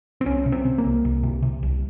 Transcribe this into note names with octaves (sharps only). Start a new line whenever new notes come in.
C4
C2 C#4
C3
C4
C3
A#3
C2
C2
C3
C3
C2